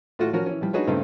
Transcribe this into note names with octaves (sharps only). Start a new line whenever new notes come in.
A2 A3 F4 F#4
F3 C#4 F#4 A#4
E3 C#4
E3 F3 G3
D4 D#4 F#4 G#4 B4 C#5
G2 C#3 A3 B3 C4 D#4